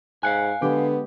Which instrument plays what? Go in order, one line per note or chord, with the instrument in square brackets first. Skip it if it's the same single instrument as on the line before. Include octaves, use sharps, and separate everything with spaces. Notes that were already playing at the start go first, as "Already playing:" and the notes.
[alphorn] G#2 [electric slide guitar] F5 F#5 G#5 [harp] F#6
[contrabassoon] D3 [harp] G#3 G4 [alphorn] B3